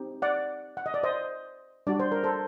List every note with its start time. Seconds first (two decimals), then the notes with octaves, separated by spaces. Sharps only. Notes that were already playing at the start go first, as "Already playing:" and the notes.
Already playing: C4 D#4 G4
0.22 D5 F#5
0.77 F#5
0.86 D#5
0.94 D5
1.03 C5 D#5
1.87 G3 D4 F#4 D5
2.00 C5
2.12 A#4
2.24 A4 C5